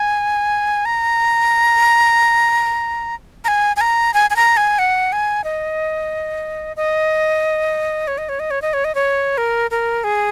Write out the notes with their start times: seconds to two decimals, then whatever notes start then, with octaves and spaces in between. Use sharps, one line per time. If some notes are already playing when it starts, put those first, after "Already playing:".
Already playing: G#5
0.85 A#5
3.44 A#5
3.48 G#5
3.76 G#5
3.81 A#5
4.14 G#5
4.30 G#5
4.36 A#5
4.57 G#5
4.79 F#5
5.12 G#5
5.44 D#5
6.76 D#5
8.08 C#5
8.18 D#5
8.29 C#5
8.40 D#5
8.51 C#5
8.62 D#5
8.74 C#5
8.85 D#5
8.95 C#5
9.38 A#4
9.71 A#4
10.04 G#4